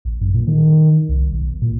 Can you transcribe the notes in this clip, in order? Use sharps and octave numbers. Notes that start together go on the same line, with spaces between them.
A#1
F#2
A#2
D#3
C2
B1
A#2